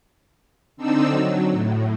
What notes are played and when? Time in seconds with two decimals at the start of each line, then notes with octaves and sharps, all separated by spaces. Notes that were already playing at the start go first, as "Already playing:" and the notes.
0.77 D3 C4 D4 D#4 E6
1.09 F#3
1.52 A2